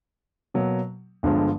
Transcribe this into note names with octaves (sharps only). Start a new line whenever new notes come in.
B2 F#3 A#3
G1 G2 D3 F3 G#3